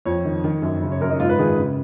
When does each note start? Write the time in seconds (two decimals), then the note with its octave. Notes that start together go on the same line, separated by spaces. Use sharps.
0.05 F2 C#5
0.25 D#3
0.44 D#3
0.62 F#2
0.82 C#3
0.92 C#5
1.01 F#2 A#4
1.10 D#4
1.20 G#2 F4
1.29 B4
1.39 D#3 G#4
1.57 C#3